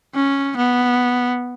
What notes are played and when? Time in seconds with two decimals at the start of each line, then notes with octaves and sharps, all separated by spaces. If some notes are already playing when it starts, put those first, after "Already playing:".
0.15 C#4
0.57 B3